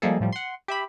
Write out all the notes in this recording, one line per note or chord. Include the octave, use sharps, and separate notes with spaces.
F3 G3 G#3 A#3 G#4 A4
A2 F3 G3
F#5 C6
G4 E5 B5